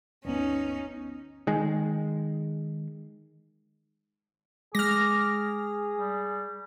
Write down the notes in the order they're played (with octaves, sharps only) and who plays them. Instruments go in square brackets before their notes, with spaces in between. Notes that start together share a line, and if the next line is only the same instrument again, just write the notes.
[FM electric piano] G1 D2 B3 [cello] C#4 D#4
[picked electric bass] D#3 G#3
[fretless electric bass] G#3 [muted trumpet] G#4 [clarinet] D6 [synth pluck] F6 A#6
[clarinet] G3